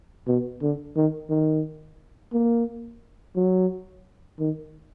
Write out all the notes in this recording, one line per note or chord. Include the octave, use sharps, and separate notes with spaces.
B2
D3
D#3
D#3
A#3
F#3
D#3